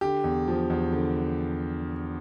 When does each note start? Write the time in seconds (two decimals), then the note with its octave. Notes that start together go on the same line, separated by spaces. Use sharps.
0.01 D3 G4
0.24 E2
0.48 F3
0.70 E2
0.92 D3